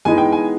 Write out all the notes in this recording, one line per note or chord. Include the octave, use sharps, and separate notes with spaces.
E3 G#3 B3 D#4 G#5
G5
G#5